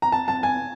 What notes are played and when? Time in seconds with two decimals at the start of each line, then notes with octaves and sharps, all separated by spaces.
0.02 A#5
0.12 A5
0.28 A5
0.43 G#5